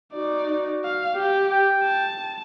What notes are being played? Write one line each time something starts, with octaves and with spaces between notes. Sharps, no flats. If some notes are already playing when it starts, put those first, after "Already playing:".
D#4 F#4 D5
F5
G4
G5
A5